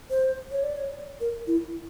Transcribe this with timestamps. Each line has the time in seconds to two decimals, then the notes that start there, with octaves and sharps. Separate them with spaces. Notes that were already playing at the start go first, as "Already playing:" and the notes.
0.10 C5
0.51 C#5
0.63 D5
0.77 C#5
1.21 A#4
1.47 E4